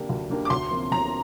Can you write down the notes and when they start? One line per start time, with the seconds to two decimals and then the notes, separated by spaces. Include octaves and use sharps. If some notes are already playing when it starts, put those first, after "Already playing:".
Already playing: D3 A#3 D4 G4
0.09 D2
0.30 D3 A#3 D4 G4
0.45 D6
0.50 D2 C6
0.71 C3 F3 A#3
0.91 D2 A#5